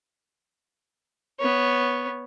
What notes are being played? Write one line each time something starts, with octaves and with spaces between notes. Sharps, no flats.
B3 C#5